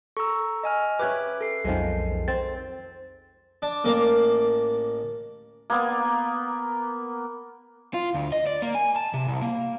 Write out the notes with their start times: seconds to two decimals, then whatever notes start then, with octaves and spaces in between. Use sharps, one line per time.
0.17 A4 A#5 C#6 E6
0.63 D#5 G#5 F6
0.99 C#4 G4 G#4 B4 E5 D6 F#6 G#6
1.41 A4 C7
1.65 B1 F2 D#3 F3 G#3
2.28 C4 A6
3.62 D4
3.85 A1 A#3 A5 D6
5.70 A#3 B3
7.94 F4
8.14 D2
8.32 D#5
8.46 D5
8.62 A#3
8.75 G#5
8.96 A5
9.14 C3
9.28 C2
9.42 A#3